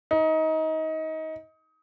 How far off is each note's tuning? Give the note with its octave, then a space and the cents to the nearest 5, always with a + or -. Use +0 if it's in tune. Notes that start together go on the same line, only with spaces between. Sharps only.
D#4 +25